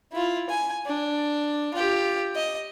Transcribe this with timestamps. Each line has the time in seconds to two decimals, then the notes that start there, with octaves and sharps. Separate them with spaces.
0.12 E4 F4
0.49 G#5
0.86 D4
1.74 F4 G4
2.35 D#5